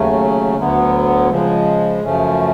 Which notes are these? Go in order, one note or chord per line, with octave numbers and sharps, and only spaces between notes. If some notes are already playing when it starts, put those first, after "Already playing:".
Already playing: D#2 C#3 F#3 A3 C#4
D2 D3 F#3 B3
C#3 F3 G#3
F#2 C#3 F3 A3 C#4